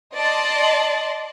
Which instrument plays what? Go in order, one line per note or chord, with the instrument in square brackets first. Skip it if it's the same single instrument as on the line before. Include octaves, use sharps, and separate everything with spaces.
[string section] D5 D#5 A5 C6